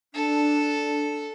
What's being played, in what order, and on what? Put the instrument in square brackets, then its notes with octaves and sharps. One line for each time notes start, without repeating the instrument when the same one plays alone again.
[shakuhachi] D4 [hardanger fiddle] A4